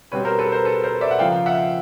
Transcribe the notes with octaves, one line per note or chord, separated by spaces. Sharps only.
B2 G3 C4 B4 C#5
A#4 C5
A4 B4
A#4 C5
A4 B4
A#4 C5
D5 E5
F#5
C#3 F3 A#3 F5 G5
E5 F#5